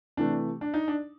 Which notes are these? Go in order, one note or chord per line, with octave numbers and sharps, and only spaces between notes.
C3 E3 A3 D4
D4
D#4
D4